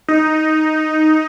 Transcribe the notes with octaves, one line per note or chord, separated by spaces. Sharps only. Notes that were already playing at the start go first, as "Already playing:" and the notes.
D#4